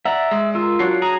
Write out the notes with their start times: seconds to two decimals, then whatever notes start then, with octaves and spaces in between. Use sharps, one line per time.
0.05 D5 E5 F#5 A#5
0.31 G#3
0.55 F4 A#4 E6
0.79 F#3 D4 F#4 C7
1.02 G#4 A#5